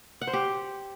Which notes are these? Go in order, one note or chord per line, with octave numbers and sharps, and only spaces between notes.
F#5
C5
G4